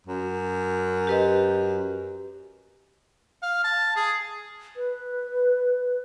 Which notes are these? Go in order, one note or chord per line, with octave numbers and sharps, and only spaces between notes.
F#2
G4 B4 D#5
F5
A5
G#4
B4